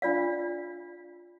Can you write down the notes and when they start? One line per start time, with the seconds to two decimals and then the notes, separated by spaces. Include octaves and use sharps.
0.02 D4 F4 D5 F5